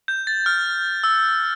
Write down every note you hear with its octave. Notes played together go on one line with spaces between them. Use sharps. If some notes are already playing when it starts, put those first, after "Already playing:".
G6
A6
F6
E6